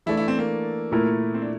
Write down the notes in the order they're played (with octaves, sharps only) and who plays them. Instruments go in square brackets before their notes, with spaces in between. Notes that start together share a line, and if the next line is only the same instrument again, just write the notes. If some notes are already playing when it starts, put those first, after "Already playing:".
[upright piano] E3 A3 D4 A4 [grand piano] E4
[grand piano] E4
C4
A#3
[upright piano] A#2 A3 E4 A#4
[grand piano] C4
D4